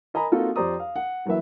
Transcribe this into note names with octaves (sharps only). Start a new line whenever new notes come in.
A#4 D#5 G#5 A#5 B5
A#3 C4 D#4 F4 F#4 A4
F2 G4 C5 D5 A#5 D#6
F5
F#5
E3 F#3 A#3 B4 E5